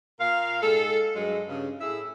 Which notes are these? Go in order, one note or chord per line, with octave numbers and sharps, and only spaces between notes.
A#2 A#4 F5
G#2 G#3 A4
G2 F#3 G#3
G2 C#3
A2 E4 G#4 E5